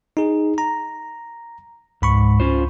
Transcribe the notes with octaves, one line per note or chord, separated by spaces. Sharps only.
D#4 G#4
A#5
C#2 G#2 B5 C#6
C#4 F4 C5